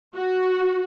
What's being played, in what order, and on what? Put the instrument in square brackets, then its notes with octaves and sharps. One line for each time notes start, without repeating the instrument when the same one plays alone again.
[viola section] F#4